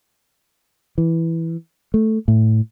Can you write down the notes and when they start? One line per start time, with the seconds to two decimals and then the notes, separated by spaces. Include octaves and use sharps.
0.98 E3
1.94 A3
2.28 A2